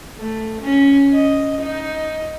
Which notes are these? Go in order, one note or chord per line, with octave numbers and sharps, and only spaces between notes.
A3
C#4
D#5
D#4